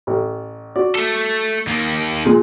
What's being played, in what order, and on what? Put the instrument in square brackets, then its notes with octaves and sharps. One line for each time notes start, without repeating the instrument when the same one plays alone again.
[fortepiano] A1
F#4 D5
[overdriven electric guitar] A3 A4
D#2 A#3
[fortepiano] A#2 G#3